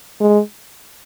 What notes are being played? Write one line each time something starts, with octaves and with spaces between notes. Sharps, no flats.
G#3